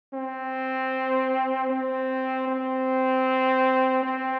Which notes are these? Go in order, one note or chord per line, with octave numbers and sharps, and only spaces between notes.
C4
C4
C4
C4